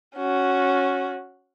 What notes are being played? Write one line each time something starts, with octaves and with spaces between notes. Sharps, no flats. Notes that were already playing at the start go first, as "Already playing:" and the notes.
C#4 F#4